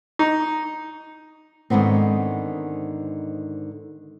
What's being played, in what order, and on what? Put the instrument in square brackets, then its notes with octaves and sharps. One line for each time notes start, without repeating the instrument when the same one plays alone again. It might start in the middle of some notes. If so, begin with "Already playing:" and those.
[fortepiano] D#4
[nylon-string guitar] G#2 D3 D#3 B3 C4